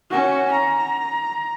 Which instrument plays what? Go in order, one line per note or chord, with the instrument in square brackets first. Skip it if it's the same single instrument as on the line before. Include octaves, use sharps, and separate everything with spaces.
[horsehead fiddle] C#4 F#4
A#5